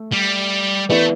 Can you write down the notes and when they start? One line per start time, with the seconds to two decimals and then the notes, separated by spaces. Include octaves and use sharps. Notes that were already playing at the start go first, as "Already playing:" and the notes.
Already playing: A3
0.13 G3
0.89 E3 A3 B3 E4 B4 D5